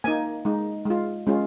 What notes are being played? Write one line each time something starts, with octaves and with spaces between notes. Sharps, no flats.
A#3 D#4 G#5
G#3 D#4
G#3 F4
G#3 C#4 F4